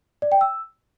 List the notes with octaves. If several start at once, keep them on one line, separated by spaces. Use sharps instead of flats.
D5
G5
E6